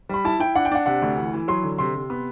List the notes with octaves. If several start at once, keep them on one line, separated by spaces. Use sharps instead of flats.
G3 B5
E4 A5
E4 G5
D4 F#5
G5
D4 F#5
C3 F#5
D2
E3
E3
F#3 C6
D3
C3 C6
C3
B3